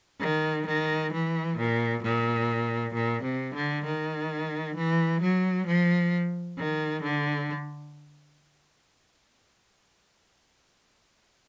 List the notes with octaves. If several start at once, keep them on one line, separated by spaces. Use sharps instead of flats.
D#3
D#3
E3
A#2
A#2
A#2
C3
D3
D#3
E3
F#3
F3
D#3
D3